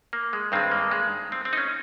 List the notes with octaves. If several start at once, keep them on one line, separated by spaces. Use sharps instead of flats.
A#3
G#3
G2 D#3 G#3 C4
A#3
G#3
C4
C4
D#4
C#4